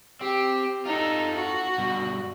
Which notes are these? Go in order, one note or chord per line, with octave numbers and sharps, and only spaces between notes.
C4 G4
D#4 F4 A4
F#4
G2 B2